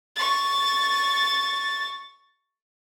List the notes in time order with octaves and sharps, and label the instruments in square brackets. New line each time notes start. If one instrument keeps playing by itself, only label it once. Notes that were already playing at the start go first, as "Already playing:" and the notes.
[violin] C#6 A6